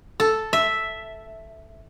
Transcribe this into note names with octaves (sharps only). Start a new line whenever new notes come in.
A4
E5